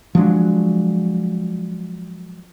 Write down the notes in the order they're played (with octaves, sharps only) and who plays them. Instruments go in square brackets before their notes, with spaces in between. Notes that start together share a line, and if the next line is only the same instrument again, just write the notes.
[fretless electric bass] F3 F#3 G#3 D4